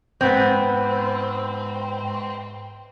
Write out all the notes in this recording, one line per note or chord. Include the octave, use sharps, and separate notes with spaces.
E2 G#2 B3 C4